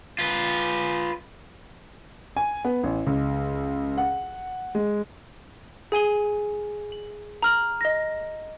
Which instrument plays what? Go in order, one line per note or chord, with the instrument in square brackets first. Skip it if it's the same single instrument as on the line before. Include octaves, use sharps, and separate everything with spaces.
[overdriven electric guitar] F4 B4
[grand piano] G#5
B3
A1
C#2
F#5
G#3
[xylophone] G#4 G#5 D#7 G7
F#7
A#5 F6 F#7
D#5 A#6